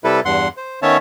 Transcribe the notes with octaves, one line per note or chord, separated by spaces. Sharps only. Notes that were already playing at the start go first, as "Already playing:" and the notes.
C3 G3 E4 A4 B4
E2 G2 F#5 C6
C5
D#3 B3 C#4 C#5 E5 A5